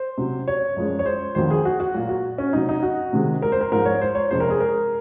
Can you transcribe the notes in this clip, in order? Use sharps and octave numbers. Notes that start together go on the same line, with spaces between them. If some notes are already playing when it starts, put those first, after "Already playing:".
Already playing: C5
C3 F#3
C#5
F#2 F3 G#3
C#5
C5
F2 D#3 F#3 C5
G#4
F#4
F#4
A#2 F#3
F#4
C#4
C3 F#3 D#4
D#4
F#4
C3 D#3 G#3
A#4
C5
A#4
G#2 F3 G#3 A#4
C#5
C5
C#5
F2 C3 F3 G#3 C5
A#4
G#4
A#4